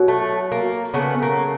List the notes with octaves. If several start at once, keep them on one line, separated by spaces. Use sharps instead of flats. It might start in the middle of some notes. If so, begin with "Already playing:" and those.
Already playing: B2 F#3
A3
A#3
C#3 F#3 A3 B3
A#3